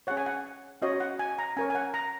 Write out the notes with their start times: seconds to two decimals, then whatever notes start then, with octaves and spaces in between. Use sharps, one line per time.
0.07 C#4 G#4 C#5 F#5
0.17 G#5
0.26 F#5
0.82 C#4 F#4 C#5 D#5
1.00 F#5
1.19 G#5
1.39 A#5
1.57 C#4 A#4 C#5 G#5
1.70 G#5
1.75 F#5
1.94 A#5